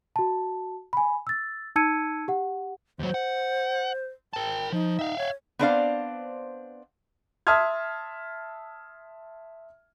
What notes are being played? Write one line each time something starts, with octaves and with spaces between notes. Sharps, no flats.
F#4 A5
G#5 B5
E6 A6
D#4 A5 E6 G#6 C#7 D#7
G4 F#5
D#2 F#3 C5
F#5
A#4 G5 A5
F3 D#4
E5 F5
C#5
B3 C4 D4 C5 D5 F5
E5 A5 C6 D#6 F6 G#6